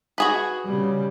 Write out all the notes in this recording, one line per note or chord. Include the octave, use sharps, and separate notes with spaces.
F#4 G#4 B4
C#3 G3